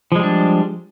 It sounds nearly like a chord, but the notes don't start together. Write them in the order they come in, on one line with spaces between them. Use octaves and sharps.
F3 G#3 G3 D4